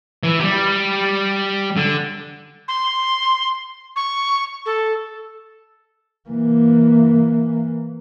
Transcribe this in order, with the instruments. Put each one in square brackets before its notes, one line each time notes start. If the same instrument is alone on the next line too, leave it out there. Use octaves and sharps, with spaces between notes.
[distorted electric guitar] E3
G3 G4
D3
[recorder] C6
C#6
A4
[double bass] E3 A#3